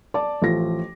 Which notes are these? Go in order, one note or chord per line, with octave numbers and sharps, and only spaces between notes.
D5 A5 D6
A1 F3 A3 F4 A#6